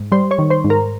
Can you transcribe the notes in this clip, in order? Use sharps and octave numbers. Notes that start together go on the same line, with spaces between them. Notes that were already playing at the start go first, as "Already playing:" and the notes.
Already playing: G#2
G3 C5 C6
C#5 C#6
D#3
C5 C6
G#2
A#4 A#5